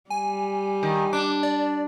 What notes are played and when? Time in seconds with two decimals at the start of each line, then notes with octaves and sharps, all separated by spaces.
0.10 G3 G#5
0.83 D#3
1.13 D4 D6
1.43 D5